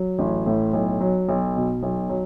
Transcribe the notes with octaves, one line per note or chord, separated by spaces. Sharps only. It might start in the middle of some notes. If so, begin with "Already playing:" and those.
Already playing: F#3
A1
A2
B1
F#3
B1
B2
B1
F#3